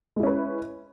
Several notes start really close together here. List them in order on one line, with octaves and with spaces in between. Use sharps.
G#3 E4 C#4 B4